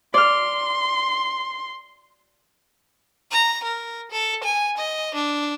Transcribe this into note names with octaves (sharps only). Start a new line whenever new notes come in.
D5 C6 F6
A#5
A#4
A4
G#5
D#5
D4